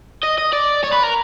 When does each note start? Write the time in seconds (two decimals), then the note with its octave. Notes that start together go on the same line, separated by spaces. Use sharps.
0.23 D#5
0.38 D#5
0.53 D5
0.84 C#5
0.93 B4
1.04 A#4